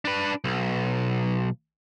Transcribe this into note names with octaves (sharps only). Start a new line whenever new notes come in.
D4 B4
B1